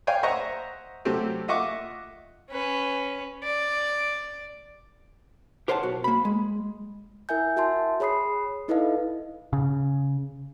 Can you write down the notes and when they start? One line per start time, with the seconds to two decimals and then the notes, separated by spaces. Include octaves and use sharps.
0.07 C#5 D5 F5 G5 G#5
0.23 C5 D#5 E5 F#5 A#5 C#6
1.05 C3 F#3 A3 C4 G4
1.48 F4 D#5 E5 F#5 C#6 D6
2.50 C#4 B4
3.43 D5
5.68 G4 A#4 C5 C#5 F#5 A5
5.83 B1 F#4
6.04 A#3 B5
6.25 G#3
7.29 E4 A#4 E5 G#5 G6
7.57 F#4 E5 A5 C6
8.00 G#4 C#5 B5 D#6 C7
8.68 D#4 E4 A4 B4 D#5 F5
9.53 C#3